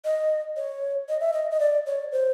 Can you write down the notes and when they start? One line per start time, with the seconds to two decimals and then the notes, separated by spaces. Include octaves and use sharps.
0.05 D#5
0.57 C#5
1.09 D#5
1.20 E5
1.34 D#5
1.51 D#5
1.60 D5
1.87 C#5
2.12 C5